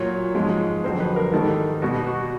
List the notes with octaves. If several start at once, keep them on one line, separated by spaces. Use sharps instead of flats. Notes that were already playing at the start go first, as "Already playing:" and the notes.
Already playing: A#2 F#3 C#5
G#2 F3 G#3
F2 D3 F#3 C5
B4
A#4
G#2 D#3 G3 A4
B2 G3 F#4
F#4